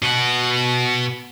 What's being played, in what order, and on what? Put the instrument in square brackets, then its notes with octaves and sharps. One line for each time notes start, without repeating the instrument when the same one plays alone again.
[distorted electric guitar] B2 F#5